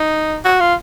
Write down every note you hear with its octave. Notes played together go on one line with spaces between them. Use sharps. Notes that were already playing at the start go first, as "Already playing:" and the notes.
Already playing: D#4
F#4
F4